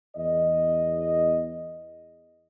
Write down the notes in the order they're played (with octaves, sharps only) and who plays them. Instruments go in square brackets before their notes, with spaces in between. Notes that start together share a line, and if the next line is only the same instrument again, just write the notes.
[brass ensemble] E2 D#5